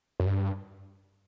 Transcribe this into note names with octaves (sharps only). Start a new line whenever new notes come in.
F#2
G2